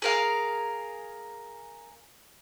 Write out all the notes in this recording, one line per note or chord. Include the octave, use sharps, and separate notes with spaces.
G#4 A#4 F5